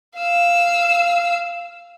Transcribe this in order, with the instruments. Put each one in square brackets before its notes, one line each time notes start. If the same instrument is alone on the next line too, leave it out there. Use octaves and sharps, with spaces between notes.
[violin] F5 E6